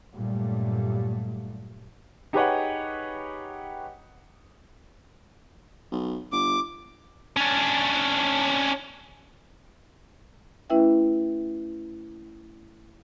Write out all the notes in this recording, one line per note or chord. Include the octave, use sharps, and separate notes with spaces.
G2 A#2 F#3 G3 A3
D#4 G4 G#4 B4 C#5 F#5
B1
G1 D6
C#4 D4
A3 C#4 E4 B4 E5 G5